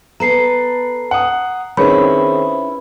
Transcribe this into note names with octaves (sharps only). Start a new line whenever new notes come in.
B3 A4 B4 A#5 C7
F#5 D#6
D#3 C4 C#4 E4 G#4 B4 C#5 B5